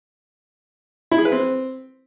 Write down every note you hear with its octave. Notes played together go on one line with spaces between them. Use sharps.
E4
G#4
B4
C4